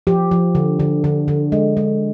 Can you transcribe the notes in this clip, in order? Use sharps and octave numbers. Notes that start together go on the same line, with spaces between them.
F3 G4
F3
D3
D3
D3
D3
G#3
G#3